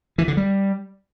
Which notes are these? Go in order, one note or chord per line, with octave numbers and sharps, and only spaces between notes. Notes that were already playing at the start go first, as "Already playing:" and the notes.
E3
D3
G3